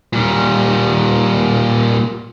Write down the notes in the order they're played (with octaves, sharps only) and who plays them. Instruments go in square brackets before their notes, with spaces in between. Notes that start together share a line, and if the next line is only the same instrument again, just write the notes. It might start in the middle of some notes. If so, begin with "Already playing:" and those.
[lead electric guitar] A#2 G3